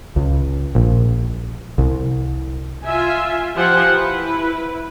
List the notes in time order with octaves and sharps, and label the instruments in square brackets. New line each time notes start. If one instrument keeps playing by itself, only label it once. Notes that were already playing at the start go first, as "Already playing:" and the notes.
[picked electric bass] C#2
A#1
C2
[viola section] F4 E5 G#5
F3 G4 C5 F#5 G#5
E4 B4